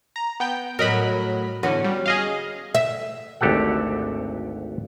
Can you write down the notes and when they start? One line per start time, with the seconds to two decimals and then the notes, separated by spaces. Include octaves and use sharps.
0.16 A#5
0.40 B3 G5 G6
0.79 A2 F#3 A#4 D#5 B5
1.63 E2 D3 C#4 F#4 B4
1.84 G3
2.06 G#4 D#5 F5
2.75 E5
3.41 G#1 D2 G4 A4 F#5